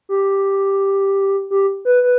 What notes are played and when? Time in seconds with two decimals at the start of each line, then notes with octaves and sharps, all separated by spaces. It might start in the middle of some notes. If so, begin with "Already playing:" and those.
0.09 G4
1.51 G4
1.85 B4
2.03 B4